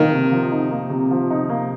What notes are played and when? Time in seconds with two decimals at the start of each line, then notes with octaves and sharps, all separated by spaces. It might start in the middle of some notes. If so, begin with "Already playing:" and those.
Already playing: D#3 F3 A#3 D#4
0.13 C3
0.32 F3
0.51 D#4
0.71 A#3
0.90 C3
1.11 F3
1.30 D#4
1.49 A#3